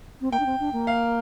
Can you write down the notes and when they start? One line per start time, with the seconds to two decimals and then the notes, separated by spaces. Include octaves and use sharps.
0.21 C4
0.32 A#3 G5
0.40 D4
0.46 C4
0.60 D4
0.73 A#3
0.87 F5